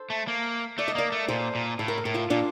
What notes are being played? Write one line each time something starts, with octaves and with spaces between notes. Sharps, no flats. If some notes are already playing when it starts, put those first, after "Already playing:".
Already playing: A4 C5
A3
A#3
A3 D5
D#5
A#3 A#4 D5
A3
A#2 A4 C5
A#2
A2 A4
A#4
A4
A2 A#4
F4 A4
A#2 D4 F4